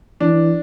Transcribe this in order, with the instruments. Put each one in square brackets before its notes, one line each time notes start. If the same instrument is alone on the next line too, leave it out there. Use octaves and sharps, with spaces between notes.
[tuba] E3 [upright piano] D4